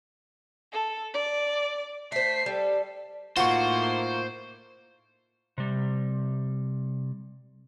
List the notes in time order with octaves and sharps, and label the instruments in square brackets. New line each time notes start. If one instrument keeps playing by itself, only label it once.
[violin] A4
D5
[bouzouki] A3 C5 [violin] B6 C7
[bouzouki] G3 [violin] A4
[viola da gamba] A2 A#3 D#4 [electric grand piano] F4 C#6 [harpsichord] F#4 [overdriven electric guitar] C5
[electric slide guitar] C3 G3